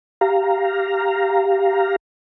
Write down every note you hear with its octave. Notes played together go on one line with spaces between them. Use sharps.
G4 F5 A#5